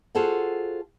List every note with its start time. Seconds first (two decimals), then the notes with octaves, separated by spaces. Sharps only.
0.15 F4 F#4 G#4 A4 C5 F#5